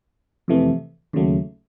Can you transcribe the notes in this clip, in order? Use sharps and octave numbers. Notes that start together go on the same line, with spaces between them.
F2 C3 E3 A3
D#2 C#3 F#3 A3